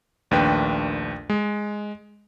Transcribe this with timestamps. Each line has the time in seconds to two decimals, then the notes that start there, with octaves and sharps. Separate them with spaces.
0.31 A#1 D#2 A3 D4 B4 G5
1.30 G#3